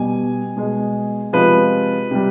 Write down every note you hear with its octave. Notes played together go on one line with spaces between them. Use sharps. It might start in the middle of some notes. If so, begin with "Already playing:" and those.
Already playing: B2 G3 G#5
B2 G#3
C3 F3 G#3 B4
C3 G3